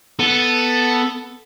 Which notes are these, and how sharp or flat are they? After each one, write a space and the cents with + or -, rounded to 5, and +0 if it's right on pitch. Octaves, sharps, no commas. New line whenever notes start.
B3 +0 A4 +0